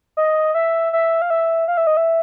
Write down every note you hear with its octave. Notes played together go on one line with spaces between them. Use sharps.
D#5
E5
E5
F5
E5
F5
E5
D#5
E5